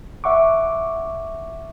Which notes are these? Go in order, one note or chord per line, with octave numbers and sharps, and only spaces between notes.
E5 F#5 C#6 D6